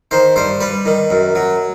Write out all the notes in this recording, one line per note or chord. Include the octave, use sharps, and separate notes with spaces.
D#3 C5
G2 C5
G3 B4
D#3
F#2
F#3